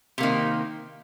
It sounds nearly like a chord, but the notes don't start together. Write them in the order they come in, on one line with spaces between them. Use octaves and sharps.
C3 A#3 D#3